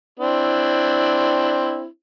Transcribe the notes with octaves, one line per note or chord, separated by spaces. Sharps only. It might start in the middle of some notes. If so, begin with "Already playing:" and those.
C4 D4 E4